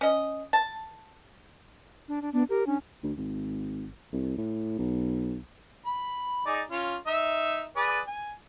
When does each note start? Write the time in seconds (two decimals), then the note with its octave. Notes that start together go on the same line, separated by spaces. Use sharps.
0.01 C#4 D#5
0.53 A5
2.08 D4
2.22 D4
2.33 B3 D4
2.50 G4 A#4
2.67 C#4 D4
3.03 D2
3.17 G#1
4.12 C2
4.37 A2
4.78 B1
5.86 B5
6.46 D#4 G#4 D5
6.71 C#4 F4
7.07 D#4 E5
7.76 G#4 B4 D5
8.07 G#5